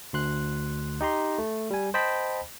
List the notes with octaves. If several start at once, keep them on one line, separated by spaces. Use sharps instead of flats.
D2 C6 F#6
D#4 G4 A#5 C6
A3
G3 G#5
C5 D#5 G5 A5 B5 B6